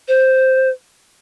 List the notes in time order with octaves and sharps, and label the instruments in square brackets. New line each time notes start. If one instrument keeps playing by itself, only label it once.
[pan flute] C5